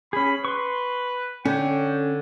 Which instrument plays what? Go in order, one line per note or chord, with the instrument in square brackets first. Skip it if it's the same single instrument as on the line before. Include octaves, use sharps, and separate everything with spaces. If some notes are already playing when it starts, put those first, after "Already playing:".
[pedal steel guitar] C#4 G#4 [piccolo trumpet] B5
[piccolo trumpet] B4 [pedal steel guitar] C6 C#6
[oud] D3 [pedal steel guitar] C#4 C#5 [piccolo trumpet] G5